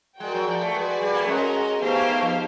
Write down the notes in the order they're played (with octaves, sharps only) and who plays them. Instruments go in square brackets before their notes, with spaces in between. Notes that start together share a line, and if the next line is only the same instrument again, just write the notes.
[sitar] G#3 [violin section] F#4 A#4 D5 G5
[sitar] F#3
F3
A3
[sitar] G#3 [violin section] F#4 B4 D5
[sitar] G3
A#3
A3
[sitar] G#3 [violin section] C#4 F#4 A#4 D#5
[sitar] A3 [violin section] B3 D#4 G4 C5 F5
[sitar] A#3
A3
F3